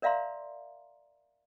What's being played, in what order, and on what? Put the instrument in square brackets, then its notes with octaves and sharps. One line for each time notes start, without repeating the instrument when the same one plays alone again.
[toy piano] A#4 D5 E5 F5 A#5 C6